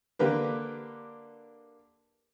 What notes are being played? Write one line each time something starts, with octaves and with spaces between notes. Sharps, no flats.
D3 A#3 G4 B4